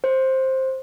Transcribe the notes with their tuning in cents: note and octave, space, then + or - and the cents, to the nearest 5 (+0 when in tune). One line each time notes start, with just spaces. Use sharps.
C5 +10